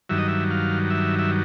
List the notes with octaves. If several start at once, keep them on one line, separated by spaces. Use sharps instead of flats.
G2 D#3 F#3 E5
D#5
E5
F5
E5
E5